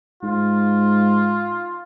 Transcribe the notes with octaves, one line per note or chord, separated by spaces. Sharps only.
G#2 F4